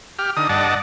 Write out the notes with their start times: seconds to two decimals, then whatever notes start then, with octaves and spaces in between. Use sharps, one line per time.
0.19 G4 F6
0.37 D3 D#4 D#6
0.49 G2 D5 D#5 F#5 A5